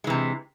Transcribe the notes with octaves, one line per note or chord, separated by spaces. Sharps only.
C3 E3 G#3